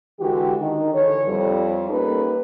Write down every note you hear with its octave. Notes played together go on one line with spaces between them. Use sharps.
D3 E3 G#3 F#4 G4
D#3 D#4
D3 E3 A4 C#5
F2 G3
A#3 C#4 D#4 G4 A4 B4